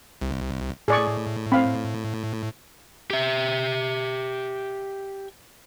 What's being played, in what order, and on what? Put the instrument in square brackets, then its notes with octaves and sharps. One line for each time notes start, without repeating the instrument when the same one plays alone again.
[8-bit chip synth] C2
[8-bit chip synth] A2 [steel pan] G#4 D5 C#6
[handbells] C4 [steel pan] C5 F5 B5
[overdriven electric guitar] G4 E5